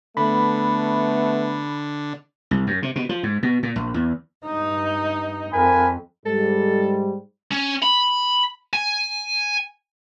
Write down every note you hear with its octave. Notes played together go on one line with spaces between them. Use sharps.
D3 A3 B3 B5
C2
F#2
C3
B2
F3
G#2
B2
A#2
A#1
E2
G2 D#4
F2 A#4 G#5 B5
G#2 G3 A4
C#4
B5
G#5